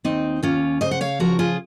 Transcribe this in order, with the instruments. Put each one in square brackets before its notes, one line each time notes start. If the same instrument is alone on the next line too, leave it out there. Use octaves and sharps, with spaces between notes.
[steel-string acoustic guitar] D#2 C4 D#4
D#2 C#4 F4
C#3 C5 D#5
F#5
C#5 F5
F3 F#4 A#4
F4 G#4